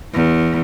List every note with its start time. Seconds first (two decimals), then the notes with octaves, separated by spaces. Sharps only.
0.14 E2